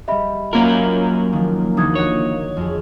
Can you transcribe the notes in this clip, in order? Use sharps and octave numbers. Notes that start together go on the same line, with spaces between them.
G3 G4 D#5 E5 B5
F#3 A#3 C#4 F4 A#4
D#3 F3
D2 E3 D#4 F#4 D#6 G#6
C#5 D#5 F#5
F2 G#4